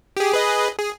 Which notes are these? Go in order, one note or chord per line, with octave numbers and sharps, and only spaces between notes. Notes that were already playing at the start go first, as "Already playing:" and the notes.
G4 G#4
G#4 B4 D#5
G#4